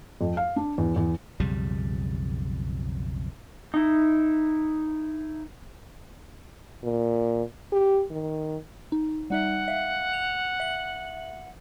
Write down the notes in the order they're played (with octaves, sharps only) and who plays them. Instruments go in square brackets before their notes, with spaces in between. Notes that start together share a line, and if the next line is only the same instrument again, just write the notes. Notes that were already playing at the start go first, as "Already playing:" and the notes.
[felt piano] F2
F5
D4
E2
E2
[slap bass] B1 F2 C#3 G3
[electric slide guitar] D#4 E4
[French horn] A#2
G4
D#3
[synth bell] D#4
[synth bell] G3 D#4 E5 [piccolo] F#5
[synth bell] E5 F5
F7
E5 F#7